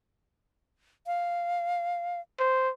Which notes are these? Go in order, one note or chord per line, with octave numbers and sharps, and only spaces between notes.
F5
C5